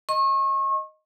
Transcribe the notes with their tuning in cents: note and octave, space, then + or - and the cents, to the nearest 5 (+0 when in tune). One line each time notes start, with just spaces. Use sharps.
D#5 +0 C#6 -35